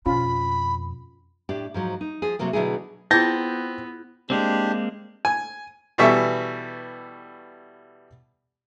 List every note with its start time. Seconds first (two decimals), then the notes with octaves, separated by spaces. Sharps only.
0.06 F2 B2 C#4 F4 B5
1.49 A2 D4 G4
1.74 G#2 F3 F#3
2.01 D#4
2.22 F3 G#4
2.39 C3 F#3 A3 A#3
2.53 B2 D3 F#3 A3 E4 G#4
3.11 B3 C4 E4 F4 G#4 A5 G6 A#6
4.30 G#3 A#3 C4 D4 G4
5.25 G#5
5.98 B2 E3 G3 A4 E5 C#6